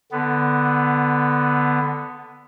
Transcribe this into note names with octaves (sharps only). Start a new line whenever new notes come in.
D3 B3